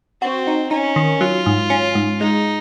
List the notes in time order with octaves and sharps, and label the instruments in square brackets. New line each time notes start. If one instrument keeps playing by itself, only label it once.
[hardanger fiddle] C4 [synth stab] F#4
[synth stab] D#4
[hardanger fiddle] C#4 [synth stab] D#4
[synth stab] D#3
[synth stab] F#3 [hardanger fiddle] F4
[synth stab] G#2
C#4
G#2
[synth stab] G#3 [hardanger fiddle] D#4